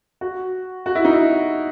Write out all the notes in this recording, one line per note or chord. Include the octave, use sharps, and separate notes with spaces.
F#4
F#4
E4
D#4
E4